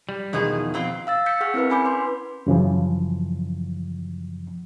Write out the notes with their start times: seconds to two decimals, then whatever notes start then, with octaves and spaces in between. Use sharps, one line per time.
0.09 G3
0.33 E2 B2 D#3 F3 D#4 G#4
0.74 B2 C4 F4
1.07 F5 E6 A6
1.26 E6 G6 B6 C#7
1.41 G#4 F#5 C#6 F6
1.54 C4 E4 A#4 B4
1.70 C#4 G#5 B5 D6 G6
1.85 B4 C6
2.47 F#2 C#3 E3 F3